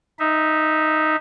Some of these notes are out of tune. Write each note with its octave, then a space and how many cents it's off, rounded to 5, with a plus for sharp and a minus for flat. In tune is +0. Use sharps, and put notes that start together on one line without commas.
D#4 +0 E5 -15